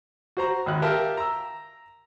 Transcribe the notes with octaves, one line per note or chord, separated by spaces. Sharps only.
F#4 C5 A#5
G#1 D#2 F#6
G4 A#4 E5 F5 G5 A5
A#5 E6